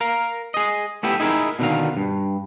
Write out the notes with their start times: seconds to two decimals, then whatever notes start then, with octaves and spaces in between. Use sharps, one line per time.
0.01 A#4 F5
0.54 G#4 D#5
1.03 A3 B3 E4 G4
1.20 D#4 E4 G#4 A#4
1.59 B2 D3 D#3 F5
1.97 G2